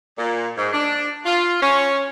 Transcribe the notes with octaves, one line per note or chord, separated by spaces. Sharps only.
A#2
G#2
D4
F4
C#4